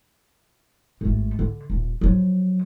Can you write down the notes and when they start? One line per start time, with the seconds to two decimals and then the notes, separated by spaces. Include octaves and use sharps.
1.01 G#1 A3
1.39 D3
1.70 D#1
2.01 F3 F#3